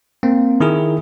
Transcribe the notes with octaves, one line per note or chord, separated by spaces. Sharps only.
A#3 C4
D#3 E4 G#4